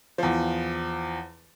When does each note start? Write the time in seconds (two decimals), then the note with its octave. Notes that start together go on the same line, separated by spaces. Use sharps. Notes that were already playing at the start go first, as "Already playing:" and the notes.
0.18 E2 F3